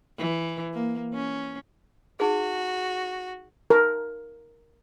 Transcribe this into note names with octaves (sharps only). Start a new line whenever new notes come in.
E3
A#3
C#4
D#4 F#4 G#4
A#4